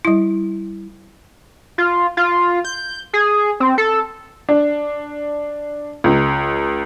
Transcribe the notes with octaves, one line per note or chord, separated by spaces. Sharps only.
G3 E4
F4
F4
G6
G#4
C4
A4
D4
C#2